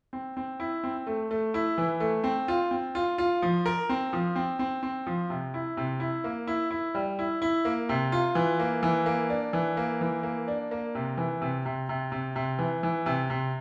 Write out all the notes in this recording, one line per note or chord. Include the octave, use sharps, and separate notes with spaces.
C4
C4
E4
C4
A3
A3
E4
E3
A3
C4
F4
C4
F4
F4
F3
A#4
C4
F3
C4
C4
C4
F3
C3
E4
C3
E4
A#3
E4
E4
G3
E4
E4
A#3
C3
F4
E3
A#3
E3
A#3
D4
E3
A#3
E3
A#3
D4
A#3
C3
E3
C3
C3
C3
C3
C3
E3
E3
C3
C3